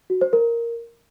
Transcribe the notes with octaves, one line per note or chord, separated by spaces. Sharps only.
F#4
C5
A#4